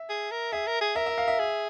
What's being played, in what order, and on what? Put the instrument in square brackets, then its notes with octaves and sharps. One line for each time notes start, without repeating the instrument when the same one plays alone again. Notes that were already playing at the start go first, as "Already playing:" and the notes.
Already playing: [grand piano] E5
[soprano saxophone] G#4
A#4
[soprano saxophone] G#4 [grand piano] E5
[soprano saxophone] A#4
G#4
[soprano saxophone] A#4 [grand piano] E5
[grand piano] E5
F5
E5
[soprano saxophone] G#4